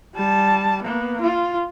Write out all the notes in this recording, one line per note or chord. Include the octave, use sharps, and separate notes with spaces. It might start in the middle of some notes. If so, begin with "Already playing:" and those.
G3 A5
A#3 B3
F4